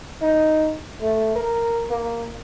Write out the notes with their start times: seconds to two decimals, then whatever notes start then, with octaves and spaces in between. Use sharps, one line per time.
0.22 D#4
1.01 A3
1.35 A#4
1.90 A#3